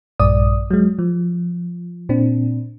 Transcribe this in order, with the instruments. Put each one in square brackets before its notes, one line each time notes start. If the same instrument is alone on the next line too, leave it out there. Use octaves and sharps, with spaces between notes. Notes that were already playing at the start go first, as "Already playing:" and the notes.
[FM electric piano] A#1 G2 D5 D#6
F#3 G#3
F3
A#2 C4 D4